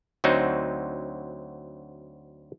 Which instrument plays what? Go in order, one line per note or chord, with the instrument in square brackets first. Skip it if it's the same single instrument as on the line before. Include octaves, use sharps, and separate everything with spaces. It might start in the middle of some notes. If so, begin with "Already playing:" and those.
[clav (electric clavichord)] D2 F#3 C4 D#4